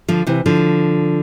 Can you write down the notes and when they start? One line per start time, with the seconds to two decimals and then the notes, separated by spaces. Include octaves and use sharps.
0.08 D3 F3
0.27 C3 E3
0.46 D3 F3